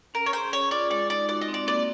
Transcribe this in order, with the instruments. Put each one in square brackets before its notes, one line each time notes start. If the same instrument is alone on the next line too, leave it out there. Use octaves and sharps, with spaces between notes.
[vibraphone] C#4 [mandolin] A#4
[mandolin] C#5
[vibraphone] G#4 [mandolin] C5
[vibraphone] C#4 [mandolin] C#5
[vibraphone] F4 [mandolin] D5
[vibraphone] G#3 [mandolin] D5
[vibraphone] D#4 [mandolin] D5
[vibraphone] F#4 [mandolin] D5
[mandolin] D#5
[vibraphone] C4
[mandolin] D5
[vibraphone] A#3 [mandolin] D5